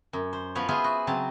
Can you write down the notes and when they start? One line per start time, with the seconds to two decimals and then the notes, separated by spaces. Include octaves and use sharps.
0.13 F#2
0.33 C5
0.55 F3 B3 B4 C#5
0.68 B3 F4 G#4 B4 C5 E5
0.84 F#4
1.07 C#3 F#3 C4 A5